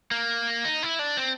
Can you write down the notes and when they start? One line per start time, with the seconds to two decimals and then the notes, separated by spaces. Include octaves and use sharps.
0.11 A#3
0.65 D#4
0.83 E4
0.99 D4
1.17 C4